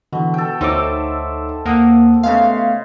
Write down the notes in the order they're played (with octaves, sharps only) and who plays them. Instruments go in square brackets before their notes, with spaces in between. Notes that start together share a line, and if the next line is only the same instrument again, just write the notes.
[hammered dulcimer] B2 [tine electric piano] D3 E3
[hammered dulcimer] A4 G5
[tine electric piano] D2 C#5 D6 [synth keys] D#4 [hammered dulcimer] A4 C5 E5
[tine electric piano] D#2 F#5 D#6 [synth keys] A#3
[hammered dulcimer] C#3 G#3 [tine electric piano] A3 B3 [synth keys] F5